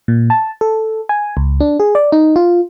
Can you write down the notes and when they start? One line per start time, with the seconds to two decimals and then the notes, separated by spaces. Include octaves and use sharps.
0.08 A#2
0.30 A5
0.61 A4
1.09 G#5
1.37 C#2
1.60 D4
1.80 G#4
1.95 D5
2.12 D#4
2.36 F4